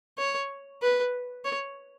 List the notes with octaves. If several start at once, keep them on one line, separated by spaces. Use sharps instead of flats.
C#5
B4
C#5